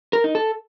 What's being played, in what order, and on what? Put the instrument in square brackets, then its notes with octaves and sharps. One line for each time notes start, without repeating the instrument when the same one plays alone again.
[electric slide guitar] A#4
D#4
A4